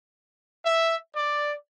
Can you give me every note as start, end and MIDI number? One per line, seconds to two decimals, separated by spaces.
0.64 0.96 76
1.15 1.54 74